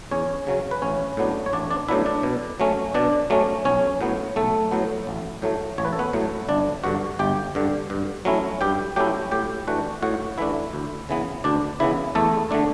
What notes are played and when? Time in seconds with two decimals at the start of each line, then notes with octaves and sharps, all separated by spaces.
0.11 E2 C#4 C#5
0.47 C#3 F#3 C#4
0.71 B4
0.82 A1 C#4 C#5
1.17 A2 F#3 B3 D4
1.46 C#5
1.53 A1 D4 D5
1.70 D4 D5
1.88 A2 F#3 B3 D4 E4 E5
2.06 D4 D5
2.23 B2
2.60 F#3 A3 C#4
2.94 B2 D4 D5
3.30 F#3 A3 C#4
3.65 B1 C#4 C#5
4.01 A2 F#3 B3
4.36 B1 A3 A4
4.71 A2 F#3 B3
5.07 A1
5.42 A2 F#3 A3
5.78 A1 C#5
5.85 B4
5.93 A4
5.99 B3 B4
6.13 A2 F#3 A3
6.49 G1 D4 D5
6.84 G2 D3 F#4 F#5
7.19 G1 G4 G5
7.55 G2 D3
7.90 G2
8.25 F#3 A3 C#4 E4
8.61 G2 G4 G5
8.96 F#3 A3 C#4 E4 G4 G5
9.31 A2 G4 G5
9.67 E3 A3 D4 F#4 F#5
10.02 A2 F#4 F#5
10.38 E3 A3 D4 E4 E5
10.73 D2
11.09 C#3 E3 B3
11.44 D2 D4 D5
11.80 C#3 E3 B3 E4 E5
12.15 E2 A3 A4
12.51 D3 A3 D4